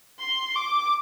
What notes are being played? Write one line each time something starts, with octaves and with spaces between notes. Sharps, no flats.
C6
D6